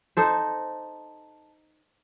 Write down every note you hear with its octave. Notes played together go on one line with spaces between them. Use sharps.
D#4 A4 C5